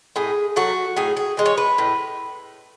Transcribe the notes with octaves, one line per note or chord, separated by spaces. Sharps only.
A2 G#4
F#3 A3 F#4
A2 G#4
G#4
E3 G#3
C#5
B4
A2